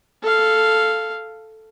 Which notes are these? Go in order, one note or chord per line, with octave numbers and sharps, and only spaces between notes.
A4 F5